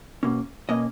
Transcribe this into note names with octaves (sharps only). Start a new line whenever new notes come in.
B2 A#3 C#4
B2 A#3 C#4 D#5